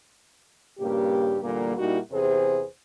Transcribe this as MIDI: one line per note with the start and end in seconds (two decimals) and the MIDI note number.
0.79 1.37 43
0.79 1.37 46
0.79 1.37 49
0.79 1.37 58
0.79 1.37 67
1.42 1.75 40
1.42 1.75 46
1.42 1.75 50
1.42 1.75 55
1.42 1.75 58
1.78 1.99 46
1.78 1.99 55
1.78 1.99 58
1.78 1.99 63
1.78 1.99 64
1.78 1.99 66
2.11 2.63 40
2.11 2.63 48
2.11 2.63 68
2.11 2.63 71
2.11 2.63 72